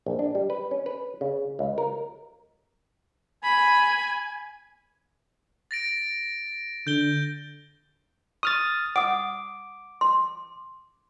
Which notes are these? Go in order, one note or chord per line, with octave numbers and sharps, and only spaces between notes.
A#1
D4
G3
B4
C#4
B4
C#3
C#2
A#4
G#5 B5
A6 A#6 D7
D3 G6 G7
C#6 D#6 F6 A6
F#5 D6 D#6
C6